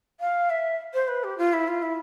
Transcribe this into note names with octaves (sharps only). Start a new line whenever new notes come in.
F5
E5
C5
B4
G4
F4
E4
F4
E4